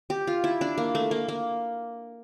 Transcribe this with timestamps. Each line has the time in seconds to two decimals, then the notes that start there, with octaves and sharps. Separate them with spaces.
0.10 G4
0.27 F4
0.44 E4
0.61 D4
0.78 A#3
0.95 A3
1.11 A#3
1.28 A#3